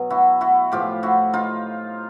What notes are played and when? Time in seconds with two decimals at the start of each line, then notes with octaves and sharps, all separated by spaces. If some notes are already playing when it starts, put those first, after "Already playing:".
Already playing: B2 F#3
0.10 E4 F#4
0.41 E4 F#4
0.72 A2 F3 F4 G4
1.03 E4 F#4
1.34 D#4 F4